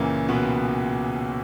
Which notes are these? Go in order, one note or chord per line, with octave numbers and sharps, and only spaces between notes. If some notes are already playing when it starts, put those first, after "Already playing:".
Already playing: C#2 A#2 C#3 E3 A#3
B2 B3